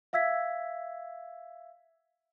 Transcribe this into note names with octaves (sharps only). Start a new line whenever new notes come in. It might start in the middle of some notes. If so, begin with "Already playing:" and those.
E5 F5 E6 G#6 B6